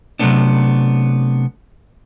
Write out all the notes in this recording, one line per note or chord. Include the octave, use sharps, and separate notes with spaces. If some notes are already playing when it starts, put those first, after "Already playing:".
C3 F#3 G3 A3 B3 D4